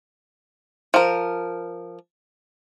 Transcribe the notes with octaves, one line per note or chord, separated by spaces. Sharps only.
F3 A#4